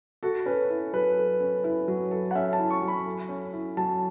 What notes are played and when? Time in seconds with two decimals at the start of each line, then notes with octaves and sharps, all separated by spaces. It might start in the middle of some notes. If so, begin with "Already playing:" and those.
0.23 F#4 A4
0.46 C#4 B4
0.70 E4
0.93 F#3 B4
1.17 A4
1.40 C#4
1.64 E4
1.88 F#3
2.11 A4
2.31 F#5
2.35 C#4 E5
2.53 A5
2.59 E4
2.70 C#6
2.82 F#3
2.88 B5
3.06 A4
3.29 C#4
3.53 E4
3.77 F#3 A5